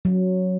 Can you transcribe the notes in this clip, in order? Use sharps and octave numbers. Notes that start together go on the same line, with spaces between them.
F#3